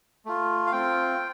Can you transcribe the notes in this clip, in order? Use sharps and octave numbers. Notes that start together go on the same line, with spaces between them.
A3 F4
F5
C4 F4 G5